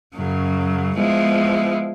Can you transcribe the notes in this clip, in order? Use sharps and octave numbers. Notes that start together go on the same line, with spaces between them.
F#2 C#3 F#3
F3 G#3 B3 E4